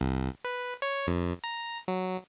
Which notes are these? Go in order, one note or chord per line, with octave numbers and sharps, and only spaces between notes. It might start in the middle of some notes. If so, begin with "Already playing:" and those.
C2
B4
C#5
F2
A#5
F#3